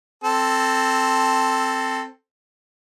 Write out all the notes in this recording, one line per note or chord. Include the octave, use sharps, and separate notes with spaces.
C4 A4